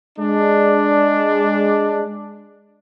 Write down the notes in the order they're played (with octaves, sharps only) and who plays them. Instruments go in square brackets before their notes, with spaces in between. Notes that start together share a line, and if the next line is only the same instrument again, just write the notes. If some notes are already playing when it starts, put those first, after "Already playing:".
[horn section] G#3 D4